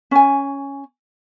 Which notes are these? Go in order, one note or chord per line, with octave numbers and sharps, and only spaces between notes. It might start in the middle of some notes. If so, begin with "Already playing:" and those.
C#4 G#5